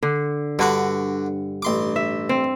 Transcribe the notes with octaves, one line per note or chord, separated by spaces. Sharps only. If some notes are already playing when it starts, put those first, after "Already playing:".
D3
G2 D3 F#4 F#5 D6
A1 C6 D6
E5
C4